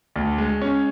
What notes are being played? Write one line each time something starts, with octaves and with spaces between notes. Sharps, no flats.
D2
G#3
C#4